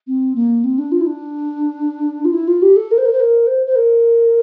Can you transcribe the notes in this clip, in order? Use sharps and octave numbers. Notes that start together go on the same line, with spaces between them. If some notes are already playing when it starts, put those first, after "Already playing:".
C4
A#3
C4
D4
F4
E4
D4
F4
E4
F4
G4
A4
A#4
C5
A#4
C5
A#4
C5
C5
A#4